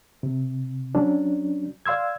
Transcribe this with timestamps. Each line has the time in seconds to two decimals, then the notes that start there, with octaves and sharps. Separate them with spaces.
0.23 C3
0.95 F#3 C#4 D4
1.86 D5 F5 C6 E6 G#6